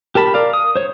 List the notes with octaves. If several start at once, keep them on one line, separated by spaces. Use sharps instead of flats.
G4 A#4 A5 B5
A#4 D5 F5
D#6
C5 C#5